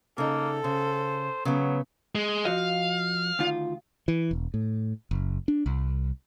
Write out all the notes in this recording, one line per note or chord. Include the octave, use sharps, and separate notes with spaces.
C#3 A#3 D#4 A4
C#3 C5
C#3 F#3 B3
G#3
F3 F#4 D#5 F5
D2 D#3 F4
E3
E1
A2
F#1
D4
C2